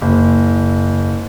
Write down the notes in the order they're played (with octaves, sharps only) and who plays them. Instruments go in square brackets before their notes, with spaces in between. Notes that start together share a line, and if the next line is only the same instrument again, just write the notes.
[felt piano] F#1